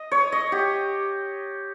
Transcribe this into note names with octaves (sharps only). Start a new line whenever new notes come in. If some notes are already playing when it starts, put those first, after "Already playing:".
Already playing: D#5
C#5
D#5
G4